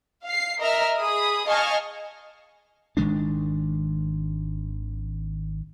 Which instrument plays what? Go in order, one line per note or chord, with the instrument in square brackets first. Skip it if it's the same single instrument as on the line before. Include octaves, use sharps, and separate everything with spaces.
[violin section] F5 C7
A#4 D#5 E5 A#5 F6
G#4 B5 D#6
D#5 F5 G#5 A5 C#6 F6
[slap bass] G#1 D#3 G#3 D4